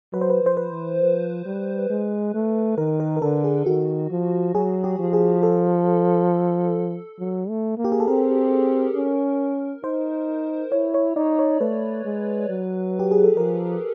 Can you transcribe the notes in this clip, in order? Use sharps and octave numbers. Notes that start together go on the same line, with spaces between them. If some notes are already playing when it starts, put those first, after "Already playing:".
F#3 B4
C5
B4
F3 C5
B4
E3
F3
G3
G#3
A3
D#3 A#4
A#4
A#4
D3 A4
G#4
D#3 F#4
F3
F#3 G#4
G4
F3
G#4
A4
F#3
A3
A#3
G4
G#4
A4
C4 A#4
C#4
D#4 C5
E4 C#5
C#5
D#4 D5
C#5
A3 B4
G#3
F#3
G4
G#4
A4
F3 A#4